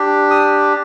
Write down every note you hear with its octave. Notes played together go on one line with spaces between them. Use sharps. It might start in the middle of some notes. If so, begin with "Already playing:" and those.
Already playing: D4 G4
D#6